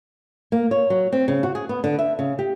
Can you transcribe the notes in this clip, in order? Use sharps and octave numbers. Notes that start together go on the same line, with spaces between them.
A#3
C#5
F#3
C4
C#3
F#4
G#4
B3
D3
E5
C#3
G4